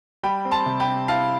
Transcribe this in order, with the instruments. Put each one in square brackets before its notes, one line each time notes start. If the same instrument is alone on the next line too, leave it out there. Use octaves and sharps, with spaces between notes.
[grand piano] G3 G5 B5
C4
A5 C6
C3
G5 B5
C4
E4 F5 A5